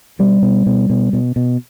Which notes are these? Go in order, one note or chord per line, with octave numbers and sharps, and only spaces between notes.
B2 G3
B2
B2
B2
B2
B2